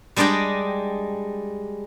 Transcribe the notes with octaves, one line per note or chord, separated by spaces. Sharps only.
G3 G#3 D4 D5 D#5 G5